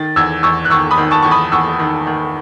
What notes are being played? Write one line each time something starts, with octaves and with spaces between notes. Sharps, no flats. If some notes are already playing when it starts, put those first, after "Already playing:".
Already playing: D#3 A6
E2 E6 G#6
E2 C#6 E6
F#6
D#3 C#6 E6
B5 D#6
D#3
A5 C#6
E2 C#6
B5 D#6
E2 C#6 E6
D#3
D#3